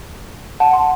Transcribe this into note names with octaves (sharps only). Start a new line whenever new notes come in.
F#5 A5
A5 C6